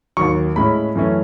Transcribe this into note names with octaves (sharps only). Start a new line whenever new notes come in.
D#2 D#3 F#3 C#6
A2 G#3 C#4 B5
F#2 E3 A3 C#4